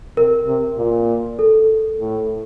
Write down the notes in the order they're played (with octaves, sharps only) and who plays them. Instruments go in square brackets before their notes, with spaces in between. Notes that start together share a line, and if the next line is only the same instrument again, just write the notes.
[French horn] C3 [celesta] A#4
[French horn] C3
A#2
[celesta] A4
[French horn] A2